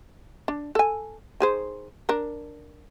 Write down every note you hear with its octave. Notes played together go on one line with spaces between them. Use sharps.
D4
A4 G#5
D#3 G#4 C5
D4 A#4